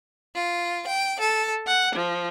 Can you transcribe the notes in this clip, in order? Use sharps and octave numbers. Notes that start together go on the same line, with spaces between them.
F4
G5
A4
F#5
F3